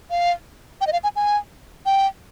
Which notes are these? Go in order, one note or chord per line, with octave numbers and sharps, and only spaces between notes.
F5
G5
D#5
F5
G#5
G#5
G5